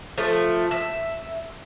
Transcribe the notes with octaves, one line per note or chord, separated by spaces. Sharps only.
F3 A3
E5